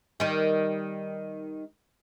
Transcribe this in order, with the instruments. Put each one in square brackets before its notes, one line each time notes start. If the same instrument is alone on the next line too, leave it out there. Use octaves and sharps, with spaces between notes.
[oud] D#3 G3